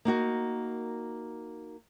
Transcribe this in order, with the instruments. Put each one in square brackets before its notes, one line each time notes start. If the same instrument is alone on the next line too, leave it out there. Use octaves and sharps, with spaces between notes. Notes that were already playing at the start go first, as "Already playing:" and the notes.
[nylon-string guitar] A#3 D#4 F#4 A#4